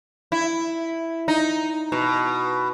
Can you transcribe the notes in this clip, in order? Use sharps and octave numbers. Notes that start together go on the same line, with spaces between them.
E4
D#4
B2